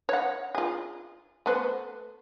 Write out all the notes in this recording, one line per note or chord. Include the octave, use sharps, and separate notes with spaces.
C#5 F#5
F4 G#4
A3 B3 C5